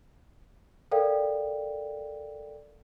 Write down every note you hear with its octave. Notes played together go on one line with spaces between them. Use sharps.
A4 A#4 D5 F5 G5